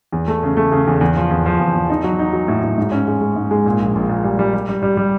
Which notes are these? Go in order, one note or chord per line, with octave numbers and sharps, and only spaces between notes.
E2
A3
C#3
A3
C#3
E2
E2
F3
E2
F3
E2
E2
D#4
F#3
D#4
F#3
A2
A2
G#2
C#4
G#3
G#3
G#2
G#3
A#2
A#1
A#1
A#2
G3
G3
G3
G3
G3
G3